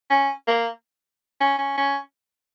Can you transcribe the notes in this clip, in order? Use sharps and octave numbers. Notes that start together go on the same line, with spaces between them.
C#4
A#3
C#4
C#4
C#4